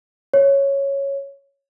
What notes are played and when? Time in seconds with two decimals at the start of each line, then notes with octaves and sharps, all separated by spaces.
0.34 C#5